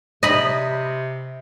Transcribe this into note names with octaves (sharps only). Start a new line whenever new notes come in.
C3 D#5 B5